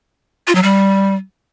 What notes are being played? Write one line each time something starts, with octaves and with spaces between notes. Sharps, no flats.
F4
F#3
G3